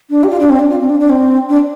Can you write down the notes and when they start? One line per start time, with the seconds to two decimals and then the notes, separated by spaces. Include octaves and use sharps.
0.10 D4
0.23 G4
0.30 F4
0.39 D4
0.49 C4
0.59 D4
0.69 F4
0.80 C4
0.89 D4
1.00 D4
1.09 C4
1.49 D4